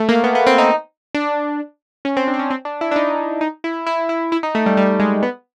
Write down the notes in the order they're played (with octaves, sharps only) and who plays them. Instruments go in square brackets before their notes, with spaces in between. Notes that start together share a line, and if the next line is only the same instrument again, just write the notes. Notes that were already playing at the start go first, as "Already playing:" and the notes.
Already playing: [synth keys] A3
A#3
B3
B3
C4
D#4
D4
C#4
C4
D4
C4
C#4
C4
D4
E4
D4
D#4
D#4
E4
E4
E4
E4
D#4
A3
G3
G3
G#3
B3